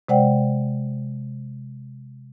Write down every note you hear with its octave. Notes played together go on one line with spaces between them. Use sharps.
C3 G#3 C5 D5 F#5 G5